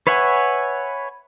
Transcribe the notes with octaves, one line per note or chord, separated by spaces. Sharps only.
B4 C#5 E5 F#5 G#5